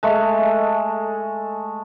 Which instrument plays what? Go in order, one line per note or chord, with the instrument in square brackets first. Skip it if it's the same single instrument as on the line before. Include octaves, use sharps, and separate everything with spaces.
[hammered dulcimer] G#3 A3